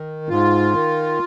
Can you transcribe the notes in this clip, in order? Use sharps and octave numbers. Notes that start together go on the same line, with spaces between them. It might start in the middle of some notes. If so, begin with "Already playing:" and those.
Already playing: D#3
G#2 F4
D#3